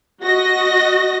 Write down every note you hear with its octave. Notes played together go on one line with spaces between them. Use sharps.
F#4 D#5 A#6